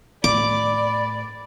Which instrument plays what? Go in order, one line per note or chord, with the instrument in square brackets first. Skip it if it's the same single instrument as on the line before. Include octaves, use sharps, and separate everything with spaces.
[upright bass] A2 [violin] D5 [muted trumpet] B5 [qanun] D6